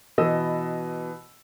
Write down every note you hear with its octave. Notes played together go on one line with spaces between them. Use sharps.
B2 E3 D#5 E6